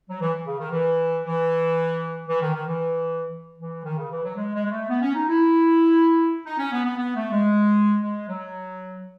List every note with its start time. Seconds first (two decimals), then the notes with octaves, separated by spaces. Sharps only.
0.09 F#3
0.20 E3
0.46 C#3
0.59 D#3
0.71 E3
1.24 E3
2.28 E3
2.41 D#3
2.54 D#3
2.67 E3
3.58 E3
3.84 D#3
3.97 C#3
4.11 E3
4.24 F#3
4.36 G#3
4.54 G#3
4.65 G#3
4.71 A3
4.89 B3
5.02 C#4
5.14 D#4
5.28 E4
6.46 D#4
6.59 C#4
6.71 B3
6.85 B3
6.97 B3
7.15 A3
7.32 G#3
8.01 G#3
8.27 F#3